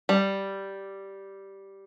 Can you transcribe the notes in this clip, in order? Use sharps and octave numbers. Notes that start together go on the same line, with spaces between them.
G3